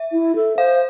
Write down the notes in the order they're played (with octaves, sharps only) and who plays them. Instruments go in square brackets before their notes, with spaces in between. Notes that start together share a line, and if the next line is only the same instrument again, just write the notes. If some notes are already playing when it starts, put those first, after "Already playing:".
Already playing: [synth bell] E5
[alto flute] E4
A4
[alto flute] C5 [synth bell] F5